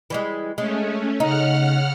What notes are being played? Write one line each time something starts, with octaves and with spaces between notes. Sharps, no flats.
E3 G3 G#3
G#3 A3 C#4
C#3 D#4 F#5 F6